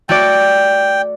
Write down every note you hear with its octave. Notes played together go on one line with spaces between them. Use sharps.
A3 F#4 D5 G5